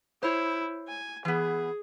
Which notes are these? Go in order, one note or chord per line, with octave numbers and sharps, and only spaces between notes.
E4 C5 C#5
G#5
E3 B3 G#4